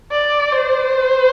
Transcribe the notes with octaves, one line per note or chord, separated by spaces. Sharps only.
D5
C5